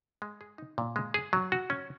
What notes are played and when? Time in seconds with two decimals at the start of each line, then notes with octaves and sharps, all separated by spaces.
0.22 G#3
0.41 G#4
0.58 D#4
0.78 A#2
0.96 G#3
1.14 G#4
1.33 F#3
1.52 F#4
1.70 C#4